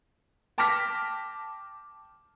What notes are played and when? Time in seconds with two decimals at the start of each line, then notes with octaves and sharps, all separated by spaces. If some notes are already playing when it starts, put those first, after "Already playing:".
0.58 G5 A5 D6 F6 A#6 B6